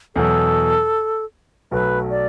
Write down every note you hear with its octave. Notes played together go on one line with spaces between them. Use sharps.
E2 B2 F#3 A4
B1 B2 F#3 A3 B4
D5